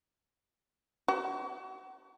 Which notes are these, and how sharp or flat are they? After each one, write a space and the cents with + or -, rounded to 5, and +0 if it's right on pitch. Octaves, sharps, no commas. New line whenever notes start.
F#4 +35